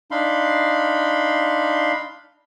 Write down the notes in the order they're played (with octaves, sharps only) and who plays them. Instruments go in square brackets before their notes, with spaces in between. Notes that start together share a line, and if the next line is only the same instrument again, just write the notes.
[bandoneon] D4 D#4 F5 B5 C6